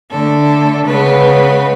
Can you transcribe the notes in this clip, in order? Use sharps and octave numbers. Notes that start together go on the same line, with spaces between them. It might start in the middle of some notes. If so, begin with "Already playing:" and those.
D3 A3 A4
C#3 G#3 B3 B4